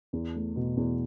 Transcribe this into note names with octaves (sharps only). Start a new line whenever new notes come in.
E2
A3
B2
E2